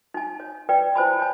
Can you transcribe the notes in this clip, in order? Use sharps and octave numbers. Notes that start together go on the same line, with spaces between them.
D#4 G#5
C#5
B4 D5 G5
E4 C5 G#5 B5
C#5 G#5